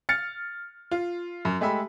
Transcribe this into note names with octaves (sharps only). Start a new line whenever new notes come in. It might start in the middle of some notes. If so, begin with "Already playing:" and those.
F6 A6 C#7
F4
F#2
G#3 A3 G4 E5 B5